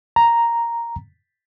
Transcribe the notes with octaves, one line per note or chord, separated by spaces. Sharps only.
A#5